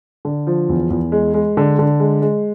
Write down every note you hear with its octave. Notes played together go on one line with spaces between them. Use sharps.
D3
F3
E2
E2
G#3
G#3
D3
D3
G#3
G#3